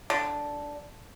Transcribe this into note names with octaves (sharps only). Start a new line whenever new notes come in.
D3